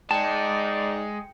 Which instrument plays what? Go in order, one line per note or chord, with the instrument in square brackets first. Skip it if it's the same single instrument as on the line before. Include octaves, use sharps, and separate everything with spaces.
[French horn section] G#2 D#4 D5 [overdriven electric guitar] G#3 [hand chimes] G5 C#7 [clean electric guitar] A5